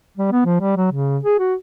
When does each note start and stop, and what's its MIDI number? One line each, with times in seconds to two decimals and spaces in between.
0.17 0.31 55
0.32 0.44 59
0.46 0.59 53
0.61 0.76 55
0.77 0.87 54
0.92 1.18 49
1.23 1.39 68
1.39 1.55 66